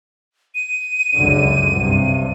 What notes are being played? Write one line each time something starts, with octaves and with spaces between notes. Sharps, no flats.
D#7
C#2 F#2 D3
C2 G2 C3